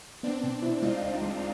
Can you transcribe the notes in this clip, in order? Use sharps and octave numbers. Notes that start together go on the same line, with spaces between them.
B3 C4 D4
B2
E4
G#3 D#4 F4
C#2
G#3